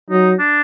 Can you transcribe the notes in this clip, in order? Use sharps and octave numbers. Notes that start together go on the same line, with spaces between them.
F#3 D#4
D4